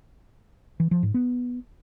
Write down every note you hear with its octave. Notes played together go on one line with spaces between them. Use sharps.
E3
F3
G#2
B3